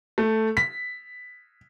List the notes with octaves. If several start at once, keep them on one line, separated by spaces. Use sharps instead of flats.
A3
B6